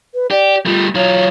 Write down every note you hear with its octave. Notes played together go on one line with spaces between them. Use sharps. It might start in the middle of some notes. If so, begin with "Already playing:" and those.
B4
G4 D5
G3 A3 F4
F#3 F4 C#5